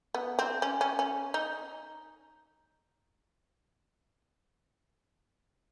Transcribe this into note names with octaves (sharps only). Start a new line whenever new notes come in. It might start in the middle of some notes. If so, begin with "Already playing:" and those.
B3
C4
C#4
C#4
C#4
D#4